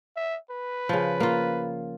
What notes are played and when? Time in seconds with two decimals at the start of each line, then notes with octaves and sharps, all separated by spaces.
0.16 E5
0.51 B4
0.89 C#3 F3
1.20 A#3 F4